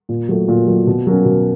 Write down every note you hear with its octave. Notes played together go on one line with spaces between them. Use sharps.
A#2
F#3 A3
A#2
F#3 A3
B2
F#3 A#3 C#4
B2